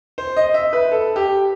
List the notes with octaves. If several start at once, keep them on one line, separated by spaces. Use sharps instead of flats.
C5
D#5
E5
B4
A4
G4